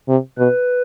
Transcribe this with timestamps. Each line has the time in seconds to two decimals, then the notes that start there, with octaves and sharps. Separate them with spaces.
0.09 C3
0.38 B2 B4